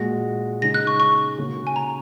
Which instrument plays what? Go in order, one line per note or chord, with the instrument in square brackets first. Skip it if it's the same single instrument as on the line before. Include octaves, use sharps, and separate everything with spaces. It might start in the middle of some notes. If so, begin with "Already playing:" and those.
Already playing: [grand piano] A#2 G#3 F#4 [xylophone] A#6
[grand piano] C#3 G#3 D#4 [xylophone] A#6
[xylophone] F#6
C#6
C#6
[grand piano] C#3 A#3 F#4
[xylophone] G#5
A#5